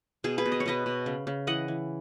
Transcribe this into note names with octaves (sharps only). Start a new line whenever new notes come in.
B2 G#4
G#4 B4
B2
D#5
C#5
B2 B4 D#5
B2
C#3
C#3
E3 D#5 F#5
E3